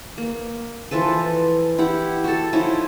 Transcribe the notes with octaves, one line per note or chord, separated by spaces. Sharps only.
A#3
E3 F3 A4 B4
E4 G4 F#5
F#4 A4
F3 C#4 D#4 E4